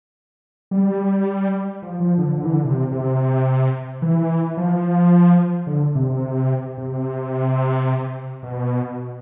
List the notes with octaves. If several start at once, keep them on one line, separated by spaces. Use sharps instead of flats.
G3
F3
F3
D3
D3
E3
D3
C3
C3
E3
F3
D3
C3
C3
B2